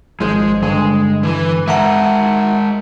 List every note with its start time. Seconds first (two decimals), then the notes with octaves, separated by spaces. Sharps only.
0.20 G#1 F3 G#3 C5
0.62 G2 D3 G#3
1.23 E3 B4
1.68 G#3 A#4 E5 F#5 A#5